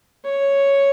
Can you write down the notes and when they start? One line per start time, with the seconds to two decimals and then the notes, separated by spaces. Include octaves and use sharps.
0.25 C#5